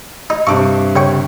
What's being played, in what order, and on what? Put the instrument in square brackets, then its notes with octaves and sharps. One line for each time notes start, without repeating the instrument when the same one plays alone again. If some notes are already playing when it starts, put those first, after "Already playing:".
[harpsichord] D#4
[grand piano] G2 C3 [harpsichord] C#6 D6
[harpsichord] C#3 G5 C#6